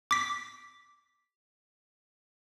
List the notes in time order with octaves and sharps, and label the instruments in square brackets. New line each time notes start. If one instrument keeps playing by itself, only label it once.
[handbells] D6 B6